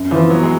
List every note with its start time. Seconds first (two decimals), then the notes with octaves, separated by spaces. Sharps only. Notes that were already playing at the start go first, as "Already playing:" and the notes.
Already playing: F#2
0.11 E3 F3
0.30 F#3 B3
0.43 G#3